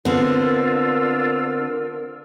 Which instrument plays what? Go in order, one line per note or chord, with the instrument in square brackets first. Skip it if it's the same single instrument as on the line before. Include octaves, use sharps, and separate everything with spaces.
[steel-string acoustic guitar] D3 C4 [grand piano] B3 [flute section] D4 F4 E6 [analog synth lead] A#4